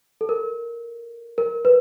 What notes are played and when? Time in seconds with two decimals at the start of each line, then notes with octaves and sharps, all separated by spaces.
0.21 A4
0.29 A#4
1.38 A#4
1.65 B4